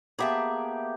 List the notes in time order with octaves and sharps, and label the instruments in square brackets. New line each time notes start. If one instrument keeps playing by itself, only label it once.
[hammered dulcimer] A#3 B3 G4 [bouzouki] G#4 E5 A5